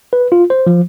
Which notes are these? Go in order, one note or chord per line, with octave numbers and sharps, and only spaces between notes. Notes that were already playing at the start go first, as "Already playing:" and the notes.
B4
F4
C5
F3